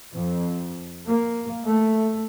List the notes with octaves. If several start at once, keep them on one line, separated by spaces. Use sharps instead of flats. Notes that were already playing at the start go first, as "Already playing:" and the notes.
F2
A#3
A3